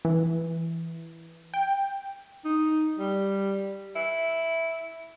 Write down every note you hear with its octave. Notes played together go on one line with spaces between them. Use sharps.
E3
G5
D#4
G3
E4